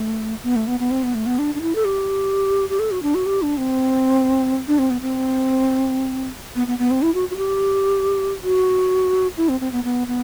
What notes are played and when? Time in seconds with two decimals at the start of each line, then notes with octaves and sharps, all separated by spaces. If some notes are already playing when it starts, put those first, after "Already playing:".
Already playing: A3
0.44 B3
0.56 A3
0.67 B3
0.80 B3
0.91 C4
1.03 B3
1.15 A3
1.26 B3
1.39 D4
1.55 D4
1.61 E4
1.75 A4
1.85 G4
2.70 G4
2.79 A4
2.91 F#4
3.03 D4
3.15 F#4
3.26 G4
3.42 D4
3.57 C4
4.68 D4
4.79 C4
4.90 B3
5.01 C4
6.56 B3
6.67 B3
6.79 B3
6.91 C4
7.02 E4
7.14 F#4
7.30 F#4
7.37 G4
8.43 F#4
9.37 E4
9.49 C4
9.60 C4
9.72 B3
9.84 B3
10.07 B3